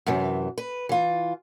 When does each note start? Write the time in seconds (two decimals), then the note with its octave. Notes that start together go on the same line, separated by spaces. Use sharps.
0.07 F#2 C3 E3
0.58 B4
0.89 E3 F4